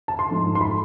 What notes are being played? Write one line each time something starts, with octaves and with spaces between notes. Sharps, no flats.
A5
C6
G#2 F3 A3
C6
B5